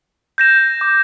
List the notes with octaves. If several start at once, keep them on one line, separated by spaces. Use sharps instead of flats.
G6 A#6 E7
D6